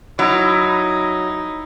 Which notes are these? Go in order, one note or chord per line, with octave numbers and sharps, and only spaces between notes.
F#3 D#4 E4